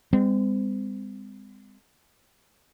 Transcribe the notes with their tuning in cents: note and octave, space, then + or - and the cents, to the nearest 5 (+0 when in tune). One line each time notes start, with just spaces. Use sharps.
G#3 -45 C4 -35